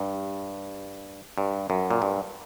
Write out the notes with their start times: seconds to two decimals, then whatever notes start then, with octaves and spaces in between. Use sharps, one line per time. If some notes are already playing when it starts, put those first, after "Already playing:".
Already playing: G2
1.38 G2
1.70 F#2
1.91 A#2
2.02 G2